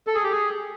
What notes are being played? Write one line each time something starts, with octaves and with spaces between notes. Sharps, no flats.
A4
G#4
G4
G#4